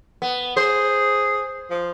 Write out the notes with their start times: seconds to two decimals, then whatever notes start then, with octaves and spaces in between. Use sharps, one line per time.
0.22 B3
0.57 G#4 C5
1.70 F3